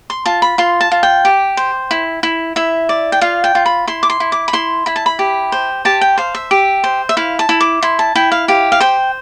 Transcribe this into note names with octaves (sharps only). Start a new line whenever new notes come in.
C6
F4 A5
B5
F4 C6
A5
F4
G5
G4
C5
E4
E4
E4 E5
D5
G5
F4 F5
G5
F4
B5
E4 C6
D6
C6
E4
D6
B5
E4 C6
E4 B5
A5
B5
G4
C5
G4 A5
G5
C5 F5
E5
G4
C5
E5
E4 F5
A5
E4
D6
E4 C6
A5
E4 G5
F5
G4 F5
F5
C5 G5